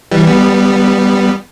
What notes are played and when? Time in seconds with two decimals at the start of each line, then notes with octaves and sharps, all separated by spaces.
0.11 E3 G3
0.27 G3 B3